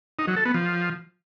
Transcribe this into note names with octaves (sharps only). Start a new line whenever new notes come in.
D#4
F#3
A4
B3
F3